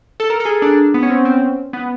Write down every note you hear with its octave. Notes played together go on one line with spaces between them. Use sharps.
A4
A#4
A4
G#4
D4
B3
C#4
C4
C4
B3